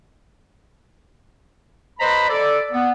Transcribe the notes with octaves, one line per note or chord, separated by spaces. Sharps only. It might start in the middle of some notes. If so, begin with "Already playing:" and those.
B4 C5 D#5 A#5 B5
A4 D5
B3